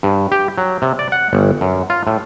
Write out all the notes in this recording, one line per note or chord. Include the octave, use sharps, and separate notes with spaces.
G2
G4
F#3
C3
D5
F#5
G1
F#2
F4
A2